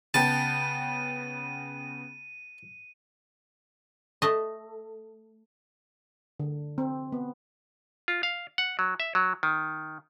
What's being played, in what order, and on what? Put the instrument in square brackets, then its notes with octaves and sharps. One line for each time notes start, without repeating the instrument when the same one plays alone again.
[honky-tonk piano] C#3 B3 G5 [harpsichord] A5 [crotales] D#7
[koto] A3 D#5
[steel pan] D3
C4
B3
[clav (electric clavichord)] F4
F5
F#5
F#3
E5
F#3
D#3